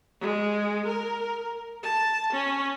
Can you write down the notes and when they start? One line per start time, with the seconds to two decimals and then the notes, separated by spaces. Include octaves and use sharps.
0.20 G#3
0.86 A#4
1.83 A5
2.33 C#4